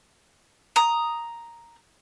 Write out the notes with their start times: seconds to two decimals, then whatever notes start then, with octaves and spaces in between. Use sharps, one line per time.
0.76 A#5 D#6